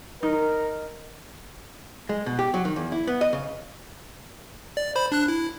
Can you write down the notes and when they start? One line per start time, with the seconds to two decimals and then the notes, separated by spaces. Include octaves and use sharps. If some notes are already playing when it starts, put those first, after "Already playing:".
0.23 D#4 A#4
2.09 G#3
2.26 B2
2.39 G4
2.54 F#3
2.65 D#3
2.76 E2
2.92 E4
3.07 B3
3.21 D#5
3.33 C#3
4.77 D5
4.96 C5 B5
5.12 D4 F#6
5.28 E4